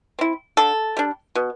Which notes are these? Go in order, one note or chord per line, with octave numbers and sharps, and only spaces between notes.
C4 E4
D3 A4
G3 D4
B2